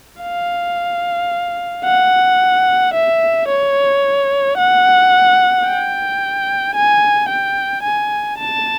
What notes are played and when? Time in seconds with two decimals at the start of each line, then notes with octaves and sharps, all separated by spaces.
0.22 F5
1.85 F#5
2.94 E5
3.48 C#5
4.57 F#5
5.66 G5
6.75 G#5
7.29 G5
7.83 G#5
8.38 A5